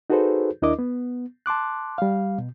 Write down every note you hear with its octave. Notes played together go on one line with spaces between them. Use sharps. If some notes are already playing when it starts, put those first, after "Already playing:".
D#4 F#4 G#4 A4 B4 C5
D#2 D4 E4 A#4 D#5 D6
B3
A5 C6 D6 F#6
G3 F5
B2